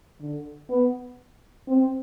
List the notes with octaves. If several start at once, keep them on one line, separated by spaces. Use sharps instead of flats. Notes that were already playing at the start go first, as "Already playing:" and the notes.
D3
B3
C4